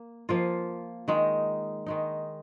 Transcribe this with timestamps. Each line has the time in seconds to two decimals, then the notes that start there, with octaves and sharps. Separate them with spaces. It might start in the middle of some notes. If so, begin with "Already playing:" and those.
Already playing: A#3
0.29 F3 A#3 F4
1.08 D#3 G#3 D#4
1.86 D#3 G#3 D#4